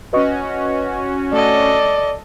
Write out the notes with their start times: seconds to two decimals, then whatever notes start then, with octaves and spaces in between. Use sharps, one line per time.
0.13 C#4 F#4 B4 D#5 C#6
1.33 A3 A4 D5 D#5